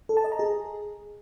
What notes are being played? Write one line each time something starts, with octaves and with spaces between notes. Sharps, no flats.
A4
A5
D#5
A#5
G#4